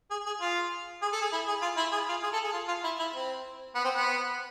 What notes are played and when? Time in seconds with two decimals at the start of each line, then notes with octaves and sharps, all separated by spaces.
0.11 G#4
0.26 G#4
0.41 F4
1.02 G#4
1.12 A4
1.22 G#4
1.32 E4
1.48 G#4
1.62 F4
1.77 E4
1.92 G#4
2.08 F4
2.23 G#4
2.33 A4
2.44 G#4
2.53 F4
2.68 F4
2.84 E4
2.99 E4
3.15 C4
3.75 B3
3.84 C4
3.95 B3